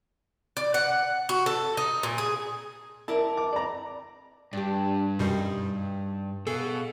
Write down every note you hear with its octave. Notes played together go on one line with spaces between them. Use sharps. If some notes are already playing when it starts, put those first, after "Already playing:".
D5
F#5
F#4
A4
D#4
A#2
G#4
E4 A#4 D5 A5
D6
D5 A#5
G2 D4 G4
F#2 B2 G3 D#4 G4 C5
B2 G#4 A4 F5